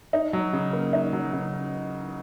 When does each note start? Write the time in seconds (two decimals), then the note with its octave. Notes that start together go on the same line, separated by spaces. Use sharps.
0.13 D#4
0.33 F#3
0.53 C#3
0.73 A#3
0.93 D#4
1.13 F#3
1.33 C#3